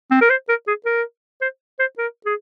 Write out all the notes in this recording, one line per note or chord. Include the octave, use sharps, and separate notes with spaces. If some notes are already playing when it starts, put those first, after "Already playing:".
C4
A#4
C5
A#4
G#4
A#4
C5
C5
A#4
G#4